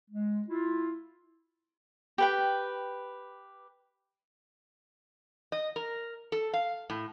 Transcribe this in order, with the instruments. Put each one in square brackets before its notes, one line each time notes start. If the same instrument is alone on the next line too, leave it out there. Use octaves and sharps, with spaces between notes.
[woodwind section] G#3
E4 F4
[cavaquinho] G4 B4 G5
[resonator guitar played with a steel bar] D#5
A#4
A4
F5
A2